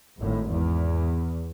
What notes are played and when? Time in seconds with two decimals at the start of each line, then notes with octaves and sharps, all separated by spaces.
0.19 G#1 A2
0.52 E2